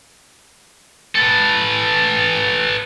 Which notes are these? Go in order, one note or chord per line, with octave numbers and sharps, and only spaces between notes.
A4 B4